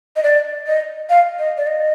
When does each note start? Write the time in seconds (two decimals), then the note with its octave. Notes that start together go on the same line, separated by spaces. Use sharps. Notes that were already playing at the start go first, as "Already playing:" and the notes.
0.16 D#5
0.23 D5
0.67 D#5
1.10 F5
1.39 D#5
1.58 D5
1.67 D#5